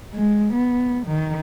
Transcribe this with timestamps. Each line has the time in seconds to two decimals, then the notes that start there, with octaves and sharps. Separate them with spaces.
0.13 G#3
0.54 B3
1.06 D#3